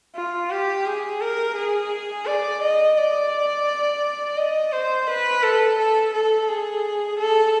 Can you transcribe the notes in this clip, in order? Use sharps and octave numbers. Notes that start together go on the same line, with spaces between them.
F4
G4
G#4
A#4
G#4
D5
D#5
D5
D#5
C5
B4
A4
A4
A4
G#4
A4